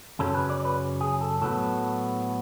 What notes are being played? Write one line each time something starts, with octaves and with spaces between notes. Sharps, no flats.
F#2 C#3 F#3 C#4 A4
B4
D5
B4
G#4
A4
A2 F#3 B3 A4